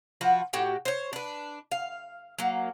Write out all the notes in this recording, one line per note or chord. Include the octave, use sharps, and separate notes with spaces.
F3 F#4 B4
A2 F#4 G4 G5
C5 C#5
D4 B4
F5
F#3 A#3